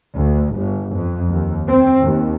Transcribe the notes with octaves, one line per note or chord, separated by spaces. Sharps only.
D2
G1
F2
D#2
C4
D#2